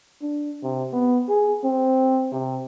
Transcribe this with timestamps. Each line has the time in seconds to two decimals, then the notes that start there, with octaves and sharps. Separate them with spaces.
0.22 D4
0.63 C3
0.92 B3
1.29 G#4
1.64 C4
2.32 C3